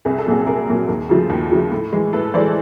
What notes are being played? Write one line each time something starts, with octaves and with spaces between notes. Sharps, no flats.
C2 G#4
A4
A#2 F#3 F#4 G#4
C2 G#4 A#4
A#2 F#3
D#2
C#3 F3 A3
D#2
C#3 F3 A3
A2
E3 G#3
A2 A4 B4
E3 G#3 C5 D5